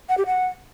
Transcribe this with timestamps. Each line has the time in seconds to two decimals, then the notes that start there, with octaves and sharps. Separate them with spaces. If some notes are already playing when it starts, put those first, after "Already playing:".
0.09 F#5
0.18 G4
0.26 F#5